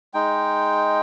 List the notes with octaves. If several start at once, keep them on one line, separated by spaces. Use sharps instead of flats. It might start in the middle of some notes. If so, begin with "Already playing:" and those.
G#3 D#4 G5